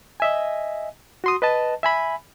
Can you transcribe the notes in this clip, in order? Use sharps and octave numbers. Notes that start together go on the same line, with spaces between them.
D#5 E5 G#5
F#4 C6 D#6
B4 D#5 A5
E5 G#5 B5